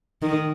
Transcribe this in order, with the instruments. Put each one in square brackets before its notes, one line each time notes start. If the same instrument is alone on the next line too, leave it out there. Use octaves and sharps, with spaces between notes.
[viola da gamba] D#3